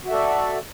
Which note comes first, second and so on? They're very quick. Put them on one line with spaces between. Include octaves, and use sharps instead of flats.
F#4 E5 A4 D5